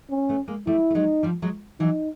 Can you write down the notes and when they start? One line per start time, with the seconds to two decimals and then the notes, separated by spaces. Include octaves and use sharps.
0.10 C#4
0.29 A3 B3
0.48 G#3 A#3
0.66 G3 A3 E4
0.90 A3
0.95 F#3 G#3 D#4
1.23 F3 G3
1.42 F#3 G#3
1.80 E3 F#3 D#4